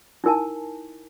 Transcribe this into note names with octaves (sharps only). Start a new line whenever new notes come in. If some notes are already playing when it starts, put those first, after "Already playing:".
D#4 E4 A#4 G#5 A5